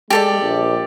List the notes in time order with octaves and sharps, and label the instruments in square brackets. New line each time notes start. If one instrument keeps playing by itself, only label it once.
[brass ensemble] G#3 [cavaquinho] G4 A4 D5
[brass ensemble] A#1